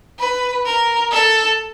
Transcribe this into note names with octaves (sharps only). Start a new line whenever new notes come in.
B4
A#4
A4